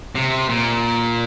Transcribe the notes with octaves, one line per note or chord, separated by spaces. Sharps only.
C3
A#2